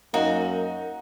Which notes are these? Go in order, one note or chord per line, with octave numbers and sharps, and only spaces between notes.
F#2 A#3 D#4 F#4